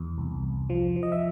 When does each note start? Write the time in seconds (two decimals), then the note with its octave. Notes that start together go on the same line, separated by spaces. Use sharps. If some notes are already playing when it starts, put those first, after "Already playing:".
Already playing: E2
0.18 C2
0.44 C2
0.70 F3
0.96 F3
1.03 D#5
1.12 E5